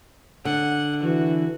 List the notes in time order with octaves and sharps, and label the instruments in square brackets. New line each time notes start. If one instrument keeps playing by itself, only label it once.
[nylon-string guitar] D3 [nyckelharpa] F#5
[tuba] E3 [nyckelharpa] F#4